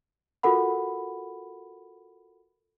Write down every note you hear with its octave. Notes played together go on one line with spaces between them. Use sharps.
F4 F#4 A4 A#4 F#5 B5